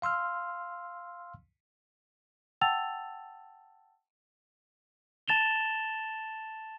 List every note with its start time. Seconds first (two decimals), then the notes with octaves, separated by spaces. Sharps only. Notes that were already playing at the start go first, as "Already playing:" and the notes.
0.02 F5 C6 E6 F6
2.61 F#5 G5 A5 E6 A6 F7
5.28 A5 A6 E7 F7 G7